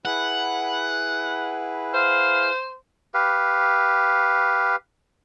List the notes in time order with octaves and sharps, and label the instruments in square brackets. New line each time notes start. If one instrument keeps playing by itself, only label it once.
[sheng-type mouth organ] E4 G#4 B4 [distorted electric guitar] F#5
[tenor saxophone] C5 [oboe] F5
[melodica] G4 B4 F5